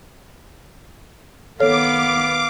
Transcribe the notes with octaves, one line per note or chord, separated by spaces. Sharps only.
D#3 B3 A4 C#5 F5 D6